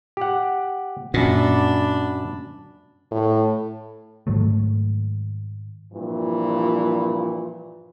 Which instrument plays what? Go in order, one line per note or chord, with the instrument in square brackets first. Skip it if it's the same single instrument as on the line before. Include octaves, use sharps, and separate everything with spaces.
[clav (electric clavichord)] G4 F#5
[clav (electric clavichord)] F#2 F#5 [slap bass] A#2 [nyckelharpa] D4 B5
[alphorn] A2
[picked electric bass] G#2 D#3 F#3 A3
[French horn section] G2 A#2 E3 F3